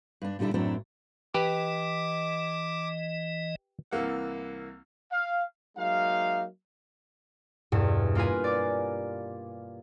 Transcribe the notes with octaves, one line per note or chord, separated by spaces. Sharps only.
G2 D4
A#2 D3 G3 D4 E4
F#2 A2 F#3 C4 D4 E4
E3 G4 B4 D#5 D6
C2 E3 A#3 F#5
F5
F#3 G#3 A#3 D#4 E5 F5
E1 E2 G2
A#3 F4 A#4 B4 G#5
D5 D6